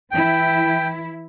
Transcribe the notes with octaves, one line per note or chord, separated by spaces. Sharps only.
E3 E4 G5